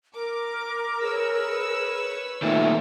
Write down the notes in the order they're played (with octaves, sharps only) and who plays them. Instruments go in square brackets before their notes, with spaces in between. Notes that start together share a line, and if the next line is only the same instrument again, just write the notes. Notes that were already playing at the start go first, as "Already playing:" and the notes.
[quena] A#4 [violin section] D6
[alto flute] G#4 [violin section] B4 C#5 E6
[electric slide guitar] A#2 D#3 A3 [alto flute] E5